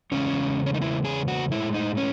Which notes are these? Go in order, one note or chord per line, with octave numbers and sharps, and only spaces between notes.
E2 C#3 G#3 C#4
C#4
D#4
E4
G#4
F#4
A2 G#3 E4
D#4
C#4